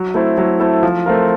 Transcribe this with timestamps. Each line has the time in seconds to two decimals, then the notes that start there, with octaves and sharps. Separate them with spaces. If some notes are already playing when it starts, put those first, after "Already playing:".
Already playing: F#3
0.14 A3 C4 E4 A4
0.38 F#3
0.60 A3 C4 E4 A4
0.83 F3
1.06 A3 C4 F4 A#4